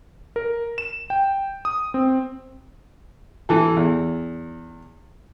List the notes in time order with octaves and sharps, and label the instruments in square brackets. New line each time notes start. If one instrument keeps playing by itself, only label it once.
[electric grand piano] A#4
E7
G5
D#6
C4
[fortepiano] E3 A4
E2